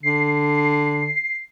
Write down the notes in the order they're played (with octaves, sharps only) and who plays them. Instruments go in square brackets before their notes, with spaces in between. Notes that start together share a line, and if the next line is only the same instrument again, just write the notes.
[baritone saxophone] D3 [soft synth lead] C7